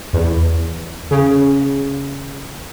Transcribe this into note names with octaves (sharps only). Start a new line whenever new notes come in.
E2
C#3